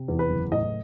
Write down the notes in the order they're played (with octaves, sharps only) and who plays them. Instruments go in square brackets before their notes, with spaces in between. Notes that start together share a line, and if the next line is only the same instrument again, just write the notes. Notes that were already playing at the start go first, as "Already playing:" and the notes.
Already playing: [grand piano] C3
E2
B4
F#1
A2 D#5